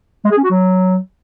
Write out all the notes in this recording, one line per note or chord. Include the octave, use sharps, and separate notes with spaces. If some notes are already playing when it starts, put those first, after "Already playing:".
G#3
G#4
C#4
F#4
F#3